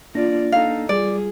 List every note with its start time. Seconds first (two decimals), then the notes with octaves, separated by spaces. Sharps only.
0.15 A#3 D4 F4 D5 A#6
0.52 D#4 A4 F5
0.89 G3 F4 G#4 D5